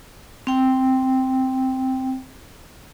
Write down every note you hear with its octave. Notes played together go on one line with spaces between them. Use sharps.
C4 G5